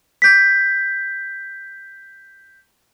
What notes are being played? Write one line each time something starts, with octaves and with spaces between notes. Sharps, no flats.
G6 B6